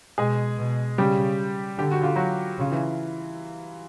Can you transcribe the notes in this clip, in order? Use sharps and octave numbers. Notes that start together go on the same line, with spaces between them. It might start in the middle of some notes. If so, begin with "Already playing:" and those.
B2 G#3 G#4
B2
C#3 G3 G4
D3 G4
F#4
F4
F#3 F#4
C#3 F4
E3 E4